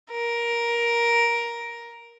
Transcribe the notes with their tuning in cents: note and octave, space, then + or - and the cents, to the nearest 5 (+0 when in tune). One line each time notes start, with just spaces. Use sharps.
A#4 +10